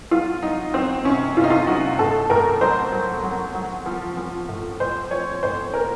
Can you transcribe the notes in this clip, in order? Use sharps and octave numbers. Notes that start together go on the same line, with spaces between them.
F#3 F4
F#3 D#4
F#3 C4
C3 C#4
C3 F4
D#4
F4
F#3 F#4
A2 A4
A2 A#4
F#3 C5
F#3
F#3
F#3
F3
F3
A2
A2 C5
F3 C#5
A2 C5
A#2 A#4